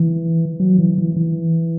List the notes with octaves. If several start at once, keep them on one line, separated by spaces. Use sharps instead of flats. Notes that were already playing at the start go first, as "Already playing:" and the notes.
Already playing: E3
F#3
E3
E3
E3